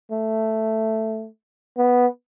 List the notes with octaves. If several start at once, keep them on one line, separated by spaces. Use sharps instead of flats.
A3
B3